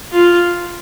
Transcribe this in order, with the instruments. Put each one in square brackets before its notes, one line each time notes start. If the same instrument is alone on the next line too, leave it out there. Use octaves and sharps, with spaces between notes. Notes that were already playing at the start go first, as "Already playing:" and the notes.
[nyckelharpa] F4